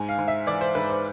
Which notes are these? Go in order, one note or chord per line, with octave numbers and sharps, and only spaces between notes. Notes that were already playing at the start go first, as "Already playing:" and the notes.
Already playing: G#2 G#5
F5
G#2
E5
E3 D5
C5
G#2 B4
C5